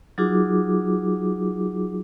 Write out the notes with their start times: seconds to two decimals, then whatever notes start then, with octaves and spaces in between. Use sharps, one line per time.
0.18 F#3 D#4 F4 F#4 G#4 D6